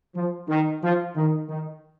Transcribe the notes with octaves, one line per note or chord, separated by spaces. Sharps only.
F3
D#3
F3
D#3
D#3